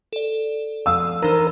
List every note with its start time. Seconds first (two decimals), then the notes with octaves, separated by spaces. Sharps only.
0.13 A4 D5
0.86 F3 F5 D#6 E6
1.22 E3 D4 D#4 A#4 C5